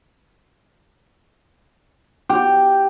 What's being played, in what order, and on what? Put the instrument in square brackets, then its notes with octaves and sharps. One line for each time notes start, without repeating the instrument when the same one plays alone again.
[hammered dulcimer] G4